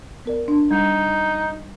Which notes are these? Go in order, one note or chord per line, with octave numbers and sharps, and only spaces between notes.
B3 A#4 D5
D4
G3 D#4